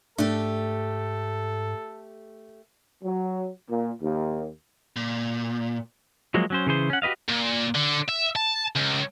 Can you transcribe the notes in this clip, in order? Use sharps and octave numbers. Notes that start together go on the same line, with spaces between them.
G#2 A3 D4 G4 A4
F#3
A#2
D#2
A#2
F3 F#3 G#3 A#3
F#3 C#4 C5
C#3 E3 G#4 C5
C#4 F#5
F#4 G4 B4 D#5 F5
A#2
D3
E5
A5
C#2